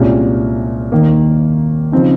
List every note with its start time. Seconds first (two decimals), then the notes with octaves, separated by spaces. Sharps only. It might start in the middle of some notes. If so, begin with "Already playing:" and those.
Already playing: C2 A#2 G#3 C#4 G4
0.92 D#2 D#3 A#3
1.92 C#3 F3 C4 D#4